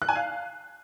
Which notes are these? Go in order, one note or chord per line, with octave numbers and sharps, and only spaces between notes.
F#6
G#5
F5